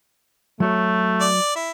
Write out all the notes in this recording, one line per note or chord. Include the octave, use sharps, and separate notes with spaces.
F#3 A3 F#4 C#5
D5
E4